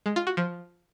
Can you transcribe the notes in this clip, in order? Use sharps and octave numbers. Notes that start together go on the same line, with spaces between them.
G#3
F4
F#4
F3